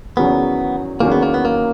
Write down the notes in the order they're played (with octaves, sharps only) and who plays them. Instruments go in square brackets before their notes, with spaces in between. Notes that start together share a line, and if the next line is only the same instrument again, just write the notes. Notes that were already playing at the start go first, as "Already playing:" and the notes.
[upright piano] E2 D#3 F#3 C#4 G#4 [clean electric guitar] B3
[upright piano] E2 D#3 F#3 C#4 G#4 [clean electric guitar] A#3
[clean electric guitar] B3
A#3
B3
A#3